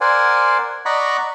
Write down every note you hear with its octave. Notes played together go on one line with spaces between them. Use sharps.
A#4 C5 D5 F#5 G#5
D5 D#5 F#5 A#5 B5 C#6